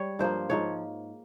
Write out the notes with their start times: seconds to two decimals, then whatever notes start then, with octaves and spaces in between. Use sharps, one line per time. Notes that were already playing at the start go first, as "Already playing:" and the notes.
Already playing: G3 C#5
0.19 G2 F3 A#3 C5
0.50 G#2 F3 A#3 C#5